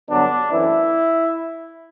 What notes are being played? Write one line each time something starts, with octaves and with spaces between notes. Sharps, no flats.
G2 D3 F#3 B3 D4
F#2 E3 A3 C4 E4